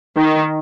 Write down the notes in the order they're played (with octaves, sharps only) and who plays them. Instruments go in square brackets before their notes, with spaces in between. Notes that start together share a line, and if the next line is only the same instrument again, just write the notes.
[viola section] D#3